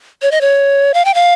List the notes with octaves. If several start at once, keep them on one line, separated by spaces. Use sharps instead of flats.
C#5
D#5
C#5
F5
G5
F5